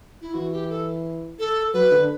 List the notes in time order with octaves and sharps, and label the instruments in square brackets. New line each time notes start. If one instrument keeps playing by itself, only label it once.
[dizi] E4
[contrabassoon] E3 [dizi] F#4
[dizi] G4
A4
A4
[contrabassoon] F#3 [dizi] B4
[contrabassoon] D3